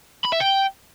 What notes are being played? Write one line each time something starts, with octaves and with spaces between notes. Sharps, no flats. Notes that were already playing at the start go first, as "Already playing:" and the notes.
B5
E5
G5